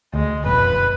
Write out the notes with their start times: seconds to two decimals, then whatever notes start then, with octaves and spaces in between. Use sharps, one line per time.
0.14 D2 G#3
0.46 F#1 B1 F2 B4